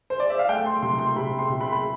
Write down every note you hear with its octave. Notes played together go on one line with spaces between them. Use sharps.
C5
D5
E5
F5
A3 G5
C6
C3 C6
C6
C3 B5
C6
C3
B5
B5